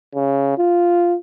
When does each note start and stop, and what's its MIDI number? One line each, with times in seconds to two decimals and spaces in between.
0.15 0.54 49
0.58 1.17 65